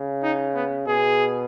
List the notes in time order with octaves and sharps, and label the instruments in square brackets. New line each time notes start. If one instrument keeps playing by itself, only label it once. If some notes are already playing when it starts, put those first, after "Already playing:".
Already playing: [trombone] C#3
[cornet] D#4
B3
[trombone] B2 [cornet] G#4